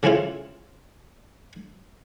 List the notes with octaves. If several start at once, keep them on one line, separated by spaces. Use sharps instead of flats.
C#3 E3 C4 E4 F4